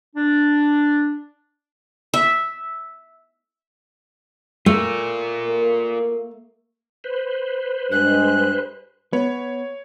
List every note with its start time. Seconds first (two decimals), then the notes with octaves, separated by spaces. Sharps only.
0.16 D4
2.14 E5
4.66 A3 F4 A#4
5.47 A#3
7.04 B4 C5
7.91 G2 G#3 F#6
9.13 B3 C#5